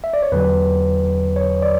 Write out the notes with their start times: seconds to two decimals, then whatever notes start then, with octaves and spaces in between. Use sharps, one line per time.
0.04 E5
0.13 D5
0.23 C#5
0.32 E2 D3 F#3 B4
1.36 C#5
1.62 D5